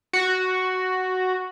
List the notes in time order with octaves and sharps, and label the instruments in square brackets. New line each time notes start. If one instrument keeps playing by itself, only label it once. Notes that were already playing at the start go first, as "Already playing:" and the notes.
[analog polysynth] F#4